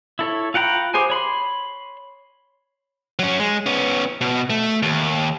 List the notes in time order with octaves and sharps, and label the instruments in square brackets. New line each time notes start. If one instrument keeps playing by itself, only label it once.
[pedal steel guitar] E4 A4 C#5
F4 F#5 G5 A#5 B5
G4 G#4 C5 G#5
C#5 B5 C6
[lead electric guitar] F#3 C#4
G#3
B3 C#4
B2
A3
D#2